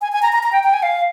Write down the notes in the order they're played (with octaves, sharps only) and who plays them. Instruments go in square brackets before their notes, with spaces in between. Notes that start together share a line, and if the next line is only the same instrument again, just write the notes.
[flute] G#5
G#5
A#5
A#5
A#5
G5
G5
G#5
F5